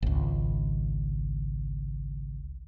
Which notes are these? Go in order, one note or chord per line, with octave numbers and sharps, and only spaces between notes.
G#1 C#2